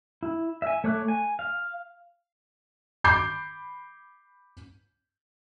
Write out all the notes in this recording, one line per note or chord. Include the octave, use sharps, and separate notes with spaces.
E4
E5 G#5
A3 C#5 D6 F#6
G#5
F5
B5 D6 G6 C7